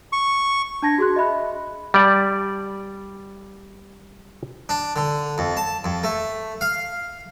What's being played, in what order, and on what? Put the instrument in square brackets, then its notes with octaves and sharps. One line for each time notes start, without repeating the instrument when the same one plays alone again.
[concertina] C#6
[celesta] D4 A5 G#6 A#6
F#4 G#4 C6 F#6
D#5 E5 B5 F#6
[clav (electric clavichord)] G3 D5 A5
[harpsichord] D4
D3
F2
A5
F2
A3
F5